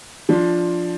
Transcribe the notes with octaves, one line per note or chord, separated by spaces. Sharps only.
F3 D4 F4